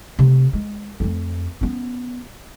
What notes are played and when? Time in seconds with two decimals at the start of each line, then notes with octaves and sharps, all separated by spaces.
0.19 C3 A3
0.53 G#3
1.00 F2 A3
1.61 B3 C#4